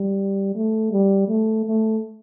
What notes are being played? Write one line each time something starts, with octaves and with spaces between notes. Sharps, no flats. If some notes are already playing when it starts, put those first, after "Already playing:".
Already playing: G3
A3
G3
A3
A3